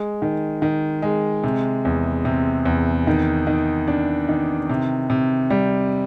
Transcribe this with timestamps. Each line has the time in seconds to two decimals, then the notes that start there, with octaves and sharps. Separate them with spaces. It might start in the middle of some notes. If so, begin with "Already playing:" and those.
Already playing: G#3
0.22 D#3
0.62 D#3
1.02 G#3
1.44 C3
1.85 E2
2.25 C3
2.65 E2
3.07 D#3
3.47 D#3
3.87 D4
4.29 D#3
4.69 C3
5.10 C3
5.50 G3